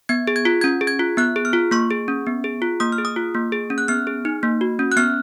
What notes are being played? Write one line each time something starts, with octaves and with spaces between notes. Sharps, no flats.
B3 G#6
G#4
G#6
F4
C#4 G#6
G#4
G#6
F4
B3 F#6
G#4
F6
F4
A#3 C#6
G#4
C#4
B3
G#4
F4
A#3 D#6
F6
G#4
D#6
F4
A#3
G#4
C#4
F#6
B3 F6
G#4
D#4
A#3
F#4
C#4
F#6
B3 F6